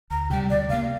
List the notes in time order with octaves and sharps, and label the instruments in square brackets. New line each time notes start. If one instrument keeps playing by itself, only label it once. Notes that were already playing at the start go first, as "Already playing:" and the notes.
[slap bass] D2 [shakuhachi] A#5
[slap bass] C3 G3 [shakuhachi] G5
[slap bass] D2 [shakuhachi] D5
[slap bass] C3 [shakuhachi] F5
[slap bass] A#3